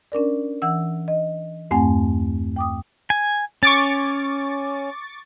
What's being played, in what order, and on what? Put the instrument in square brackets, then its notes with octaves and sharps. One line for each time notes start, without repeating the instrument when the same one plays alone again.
[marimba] C#4 D4 A#4 D5
E3 F#5 E6
D#5
E2 G2 A3 C4 F#5 G#5
G5 D6 D#6
[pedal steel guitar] G#5
[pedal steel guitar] C#4 [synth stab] C#6 D6 A6